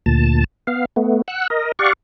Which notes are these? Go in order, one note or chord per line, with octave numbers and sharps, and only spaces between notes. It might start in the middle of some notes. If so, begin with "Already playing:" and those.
D2 A#2 A5
B3 F5
A3 B3
F#5 E6 F#6
A#4 D#5
G4 D5 F5 F#5 C#6